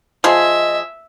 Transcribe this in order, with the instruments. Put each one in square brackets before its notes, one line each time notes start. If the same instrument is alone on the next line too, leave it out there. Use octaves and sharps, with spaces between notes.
[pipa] F3 F4 G#4 [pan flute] D#5 [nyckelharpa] E5